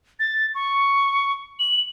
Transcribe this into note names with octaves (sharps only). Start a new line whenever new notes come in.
A6
C#6
F#7